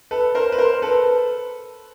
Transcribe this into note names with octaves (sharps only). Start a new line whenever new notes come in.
A4 B4
A#4 C5
B4
A#4 C5
A4 B4